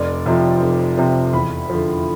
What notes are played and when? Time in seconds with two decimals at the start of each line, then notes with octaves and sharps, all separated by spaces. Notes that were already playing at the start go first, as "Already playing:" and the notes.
Already playing: F1 D5
0.26 F2 C3 F3
0.62 F1
0.98 F2 C3 F3
1.33 E2 B5
1.70 D3 F3